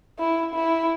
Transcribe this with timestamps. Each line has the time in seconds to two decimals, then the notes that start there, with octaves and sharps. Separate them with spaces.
0.18 E4
0.54 E4